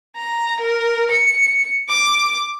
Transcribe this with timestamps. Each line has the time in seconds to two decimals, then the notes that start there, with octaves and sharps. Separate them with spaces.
0.17 A#5
0.60 A#4
1.11 C#7
1.89 D6